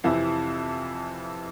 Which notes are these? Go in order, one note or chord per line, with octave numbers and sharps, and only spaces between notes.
F2 C3 E3 E4